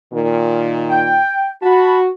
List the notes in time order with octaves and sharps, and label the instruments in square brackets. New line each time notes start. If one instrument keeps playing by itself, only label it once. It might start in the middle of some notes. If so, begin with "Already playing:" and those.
[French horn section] A#2 D#3
[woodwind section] G5
[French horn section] F#4 [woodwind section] A5 B5